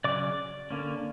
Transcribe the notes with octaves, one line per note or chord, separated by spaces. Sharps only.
C#3 F#3 C#4 D5 D6
D3 A#3 C#4